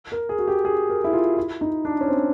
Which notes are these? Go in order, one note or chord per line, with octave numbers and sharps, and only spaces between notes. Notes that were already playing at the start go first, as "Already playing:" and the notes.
A#4
G#4
F#4
G4
G#4
A#4
E4
F4
E4
D#4
D4
C#4
C4